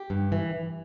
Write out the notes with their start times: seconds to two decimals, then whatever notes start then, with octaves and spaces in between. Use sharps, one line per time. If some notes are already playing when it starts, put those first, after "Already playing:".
Already playing: G4
0.10 G2
0.32 E3